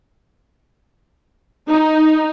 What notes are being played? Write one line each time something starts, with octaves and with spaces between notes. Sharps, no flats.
D#4